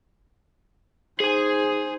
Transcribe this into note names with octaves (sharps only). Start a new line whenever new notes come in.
D#4 G#4 C5 G#5